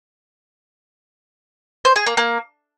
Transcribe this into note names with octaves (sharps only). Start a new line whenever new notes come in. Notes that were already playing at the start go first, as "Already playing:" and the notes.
C5
G#4
A#3
A#3